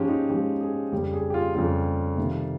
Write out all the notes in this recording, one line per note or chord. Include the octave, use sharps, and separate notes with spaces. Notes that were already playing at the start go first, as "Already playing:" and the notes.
Already playing: G#2 F3 G#3 C#4 G4
D#4
G#2 F3 G#3 G4
G#4
F2 C#3 G3 G4
G#4
G4
F4
F2 C#3 G3 F4
C3 D#3 G3